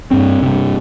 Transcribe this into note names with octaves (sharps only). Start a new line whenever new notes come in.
G2 C4
G2 C3